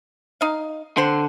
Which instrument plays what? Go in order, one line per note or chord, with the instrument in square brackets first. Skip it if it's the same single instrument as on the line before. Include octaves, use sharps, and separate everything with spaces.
[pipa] D#4 F5
[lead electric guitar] D3 [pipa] C4 C5